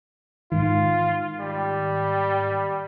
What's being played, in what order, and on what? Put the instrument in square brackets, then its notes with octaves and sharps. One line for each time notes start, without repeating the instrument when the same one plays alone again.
[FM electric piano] G#2 D#3 [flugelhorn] F4
[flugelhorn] G3